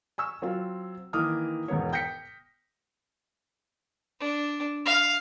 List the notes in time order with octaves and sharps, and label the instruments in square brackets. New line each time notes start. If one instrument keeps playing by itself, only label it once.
[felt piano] G#5 C#6 E6
F#3 C4 F4
D#3 E3 A#3 D6 D#6 F6
E1 G#2 B3 C#5
G5 G6 A#6 B6 C#7
[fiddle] D4
F5